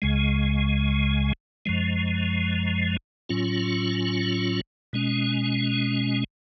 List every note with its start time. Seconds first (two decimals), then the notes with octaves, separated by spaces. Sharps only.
0.02 C#2 C#3 G#3
1.66 F#2 F3 G#3
3.29 A2 F#3 C#4 F4
4.93 B2 G#3 C#4